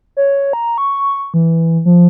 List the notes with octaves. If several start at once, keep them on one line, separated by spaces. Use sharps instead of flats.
C#5
A#5
C#6
E3
F3